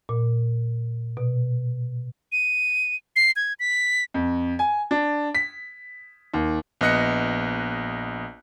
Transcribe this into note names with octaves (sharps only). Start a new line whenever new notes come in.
A#2
B2
D#7
C7
G#6
B6
F2
G#5
D4
B6
D#2
A#1 B3 D#5 F#6 C#7